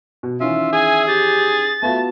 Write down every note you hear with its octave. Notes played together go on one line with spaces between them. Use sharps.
B2
D#3 E3 C#4 F4 E5
G#4 G#5
G4 A6
A3 B3 F4 F#4 A5